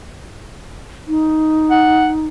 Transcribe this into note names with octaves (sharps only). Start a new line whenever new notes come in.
D#4
F#5